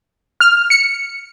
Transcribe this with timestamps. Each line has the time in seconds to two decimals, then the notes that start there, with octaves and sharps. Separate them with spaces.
0.40 F6
0.70 C#7